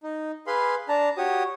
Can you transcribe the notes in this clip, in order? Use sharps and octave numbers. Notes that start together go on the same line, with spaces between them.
D#4
G#4 B4 F5 B5 C6
D4 A5 A#5
F#4 G4 C#5 D#6